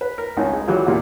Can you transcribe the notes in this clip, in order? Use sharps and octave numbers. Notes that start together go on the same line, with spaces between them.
B4
A#4
G#1 C#2 D#4
G#3
E3 F#3 G3 F4
E2 A#2 G3